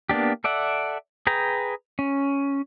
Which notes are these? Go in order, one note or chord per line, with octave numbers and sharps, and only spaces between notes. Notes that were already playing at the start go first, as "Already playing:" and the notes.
A#3 B3 D4 G4
A4 D5 E5 F#5
G#4 B4 G5 A#5
C#4